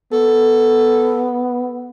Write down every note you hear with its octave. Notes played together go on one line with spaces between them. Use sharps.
B3 A4